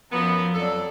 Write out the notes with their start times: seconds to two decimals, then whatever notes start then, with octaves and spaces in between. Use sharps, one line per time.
0.12 F#2 F3 B3
0.55 F2 F#3 A4 D5